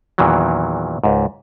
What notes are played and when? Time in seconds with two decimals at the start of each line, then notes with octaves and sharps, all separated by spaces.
0.18 E2 A#2 D#3 E3 F#3
1.04 C#2 G#2